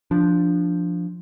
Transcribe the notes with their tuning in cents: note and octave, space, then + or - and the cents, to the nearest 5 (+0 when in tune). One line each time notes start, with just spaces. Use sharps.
F3 +0 D4 +0